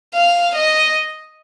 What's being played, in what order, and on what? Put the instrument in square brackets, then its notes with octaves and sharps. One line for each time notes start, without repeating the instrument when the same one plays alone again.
[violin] F5
D#5